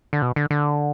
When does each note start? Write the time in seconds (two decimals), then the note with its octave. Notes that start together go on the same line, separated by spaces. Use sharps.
0.13 D3
0.22 B2
0.36 D3
0.51 D3